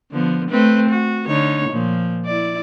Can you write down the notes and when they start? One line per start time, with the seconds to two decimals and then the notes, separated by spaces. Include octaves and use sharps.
0.12 D3 F3 B3
0.50 A3 C4 B4
0.89 F#4
1.28 D3 D#4 C#5
1.70 A#2 F3
2.26 E4 D5